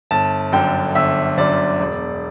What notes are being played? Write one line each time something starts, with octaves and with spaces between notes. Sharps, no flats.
G1 A5
F#2 D3 G5
G1 E5
F#2 D3 D5
E1